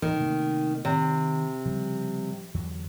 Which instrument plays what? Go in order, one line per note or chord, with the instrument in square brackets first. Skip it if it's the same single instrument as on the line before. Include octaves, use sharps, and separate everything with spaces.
[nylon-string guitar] D#3 [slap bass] E3
[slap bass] C3 A3 A#3
[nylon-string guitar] C3 [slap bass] D#3
[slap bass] C#3 F3 G3
E2 D3 F#3